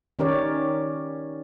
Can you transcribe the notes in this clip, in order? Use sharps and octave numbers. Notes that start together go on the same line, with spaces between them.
D#3 C#4 G4 A#4 C#5 D5